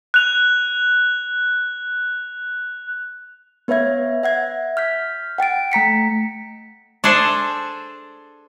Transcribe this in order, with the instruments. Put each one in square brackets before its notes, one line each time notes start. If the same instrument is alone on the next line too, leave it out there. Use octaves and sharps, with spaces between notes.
[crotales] F#6 F7
[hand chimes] B3 B4 C#5 E5 G#6
E5 F#5 G#6
F6 G6 B6
F#5 G5 A6 D7
A3 A#5 B6 C#7
[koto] D4 G#4 A4 C5